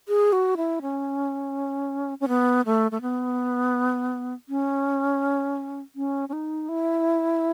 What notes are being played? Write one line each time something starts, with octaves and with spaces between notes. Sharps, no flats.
G#4
F#4
E4
C#4
C#4
B3
A3
A3
B3
C#4
C#4
C#4
D#4
E4